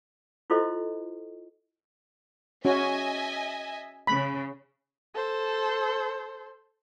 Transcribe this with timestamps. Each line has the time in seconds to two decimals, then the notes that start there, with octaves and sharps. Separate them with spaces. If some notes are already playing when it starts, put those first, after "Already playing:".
0.50 E4 F4 A4 C5 D#5 C6
2.65 C#4 F#4 D#5 E5 G#5
4.07 C#3 B5
5.15 A4 C5